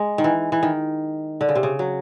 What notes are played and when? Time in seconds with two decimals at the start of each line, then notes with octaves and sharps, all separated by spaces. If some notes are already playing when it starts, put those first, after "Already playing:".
Already playing: G#3
0.18 D#3
0.24 E3
0.52 E3
0.63 D#3
1.41 D3
1.49 C#3
1.55 C3
1.63 C#3
1.79 F#3